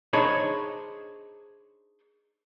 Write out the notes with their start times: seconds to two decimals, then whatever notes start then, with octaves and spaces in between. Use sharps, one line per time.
0.13 D4 D#4 G#4 C5 C#5 B5